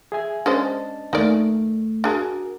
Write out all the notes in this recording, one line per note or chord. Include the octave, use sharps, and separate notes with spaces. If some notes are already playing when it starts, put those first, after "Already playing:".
G#4 E5 G#5
G#3 C#4 D4 C5 D#5 A5
D#2 A3 D#4 A#4 D5
D4 F#4 G#4 A#4